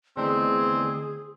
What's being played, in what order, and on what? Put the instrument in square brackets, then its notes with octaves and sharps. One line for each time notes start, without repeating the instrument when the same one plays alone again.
[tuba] E2 [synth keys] D3 D#3 A3 [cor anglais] C4 [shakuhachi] G#4